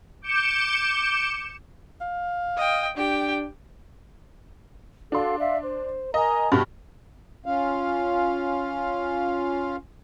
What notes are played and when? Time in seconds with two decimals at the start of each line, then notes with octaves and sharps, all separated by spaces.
0.22 D6 G6 C#7 E7
2.01 F5
2.57 D#5 G5
2.97 D4 G4 G5
5.12 D4 F#4 A4 F5 C6
5.39 D5 E5 F5
5.61 C5
6.14 A#4 D#5 G#5 A#5
6.52 G2 B2 G4
7.46 C#4 F4 F5